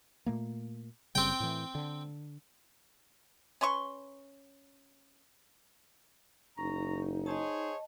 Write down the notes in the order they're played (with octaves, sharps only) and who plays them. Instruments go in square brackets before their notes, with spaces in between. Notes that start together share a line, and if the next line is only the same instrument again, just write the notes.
[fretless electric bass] A#2 A3 A#3
[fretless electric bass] F#1 C#3 G3 [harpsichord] C4 G5
[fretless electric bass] A2 E3
D3
[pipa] C#4 B4 C6 C#6
[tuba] F#1 [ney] D#4 [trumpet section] A#5 [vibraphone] C#6
[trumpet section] G#4 C5 C#5 [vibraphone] D#5 A5